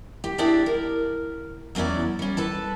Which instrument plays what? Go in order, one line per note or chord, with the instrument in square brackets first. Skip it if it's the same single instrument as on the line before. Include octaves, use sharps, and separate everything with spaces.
[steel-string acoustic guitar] G4
D4 E4 G4 G#4 D5
A#4
E2 F#3 C#4 E4 D5
G3 C#4
A4 B4 A5